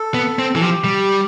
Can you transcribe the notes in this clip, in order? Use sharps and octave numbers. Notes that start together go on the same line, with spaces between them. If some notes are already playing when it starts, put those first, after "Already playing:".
Already playing: A4
B3
C4
E3 A4
F3 G4
G3